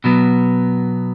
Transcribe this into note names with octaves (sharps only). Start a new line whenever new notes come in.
B2 F#3 B3